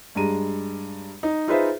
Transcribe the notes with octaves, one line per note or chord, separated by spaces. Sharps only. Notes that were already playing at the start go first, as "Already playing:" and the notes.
G2 G#3 A#5 D#7
D#4
D#4 F4 G#4 B4 C5 E5